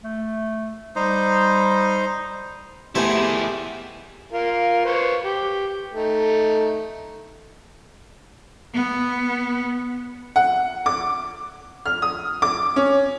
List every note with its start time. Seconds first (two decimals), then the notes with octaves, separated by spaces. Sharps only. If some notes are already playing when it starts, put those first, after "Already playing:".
0.03 A3
0.96 G3 D#4 C5
2.95 B2 A3 B3 E4 G4 G#4 C5 G#5
4.32 F4 A#4
4.85 B4 C5 C#6
5.24 G4
5.93 A3 D#4
8.75 B3
10.36 F#5
10.86 D6
11.86 F6
12.02 D#6
12.42 D6
12.76 C#4